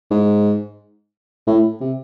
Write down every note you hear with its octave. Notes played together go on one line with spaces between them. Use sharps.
G#2
A2
C3